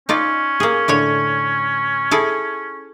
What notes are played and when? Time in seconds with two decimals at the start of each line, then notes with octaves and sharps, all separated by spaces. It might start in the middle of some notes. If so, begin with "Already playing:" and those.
0.09 C#4 D#4 F4 D5
0.60 A#3 G#4
0.88 A2 D3 C#5
2.11 E4 G#4 A4